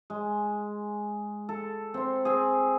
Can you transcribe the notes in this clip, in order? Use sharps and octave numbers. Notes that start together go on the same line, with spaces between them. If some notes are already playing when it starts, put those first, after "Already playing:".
G#3
A4
C4 C6
C4 G#4